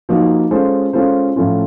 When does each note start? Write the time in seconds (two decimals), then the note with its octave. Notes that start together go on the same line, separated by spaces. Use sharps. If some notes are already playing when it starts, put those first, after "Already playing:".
0.09 F3 A#3 D#4 F#4
0.51 G#3 C#4 F4 A4 C5
0.93 G#3 C#4 F4 A4 C5
1.36 A2 F3 A3 C#4 F4